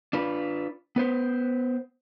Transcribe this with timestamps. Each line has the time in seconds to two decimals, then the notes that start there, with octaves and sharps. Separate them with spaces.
0.13 D4 F4 B4
0.96 B3 B4 C5